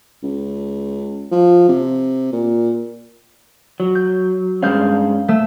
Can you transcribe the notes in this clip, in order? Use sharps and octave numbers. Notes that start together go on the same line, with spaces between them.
C#2
F3
C3
A#2
F#3
G6
G2 G#3 C#4 F5 G6
A3 E6